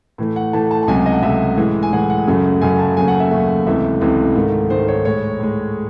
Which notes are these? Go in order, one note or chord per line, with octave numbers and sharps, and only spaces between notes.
A2 E3 A3
F#5
A2 E3 A3 A5
A5
A5
C#2 C3 F#3 A3 G#5
D#5
F#5
C#2 C3 F#3 A3 E5
A2 E3 G#3
G#5
A2 E3 G#3 F#5
F#5
F#2 C#3 F#3 A3
F#2 C#3 F#3 A3 G#5
A5
D#2 C#3 F#3 A3 G#5
F#5
E5
D#2 C#3 F#3 A3 E5
C#2 C3 E3 A3 E5
C#2 C3 E3 A3
G#2 D#3 A3
G#2 D#3 A3 C5
C#5
A2 G#3 C#5
A2 G#3